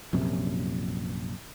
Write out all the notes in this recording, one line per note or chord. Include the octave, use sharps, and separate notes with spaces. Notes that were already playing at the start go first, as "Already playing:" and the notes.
A#1 F#2 C3